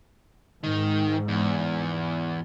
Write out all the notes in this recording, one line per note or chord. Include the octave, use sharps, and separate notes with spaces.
G#2 D#3
E2